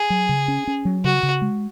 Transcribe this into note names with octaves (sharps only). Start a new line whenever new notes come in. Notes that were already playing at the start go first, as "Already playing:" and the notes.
Already playing: G#4
F#3
C#3
C#4
C#4
F#3
C#3 F#4
C#3
G#3